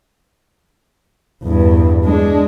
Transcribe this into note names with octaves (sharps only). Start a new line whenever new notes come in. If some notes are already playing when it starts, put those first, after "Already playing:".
E2 G2
G#3 D4